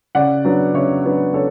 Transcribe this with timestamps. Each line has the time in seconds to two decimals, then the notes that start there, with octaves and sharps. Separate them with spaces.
0.15 C#3 D5 F#5
0.45 F#3 B3 D4
0.74 C#3 C#5 E5
1.05 F#3 B3 D4
1.34 C#3 A4 C#5